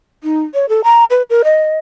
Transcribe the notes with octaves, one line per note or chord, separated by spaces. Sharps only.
D#4
C#5
A4
A#5
B4
A#4
D#5